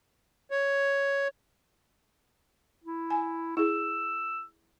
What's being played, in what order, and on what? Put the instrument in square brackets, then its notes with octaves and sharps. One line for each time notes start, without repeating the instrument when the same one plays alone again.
[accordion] C#5
[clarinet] E4
[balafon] G#5
[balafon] E4 G#4 [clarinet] E6